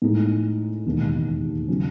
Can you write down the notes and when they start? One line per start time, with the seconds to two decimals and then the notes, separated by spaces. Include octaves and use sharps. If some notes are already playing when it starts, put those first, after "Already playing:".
0.02 A2 G#3 D#4
0.85 E1 D#2 D#3 G#3
1.68 C#3 F#3 C#4